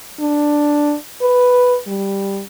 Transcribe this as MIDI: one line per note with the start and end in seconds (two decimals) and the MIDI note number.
0.20 0.95 62
1.22 1.77 71
1.87 2.42 55